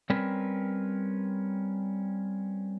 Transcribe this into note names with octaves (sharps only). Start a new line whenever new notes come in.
G3 C4 C#4 A#4 B4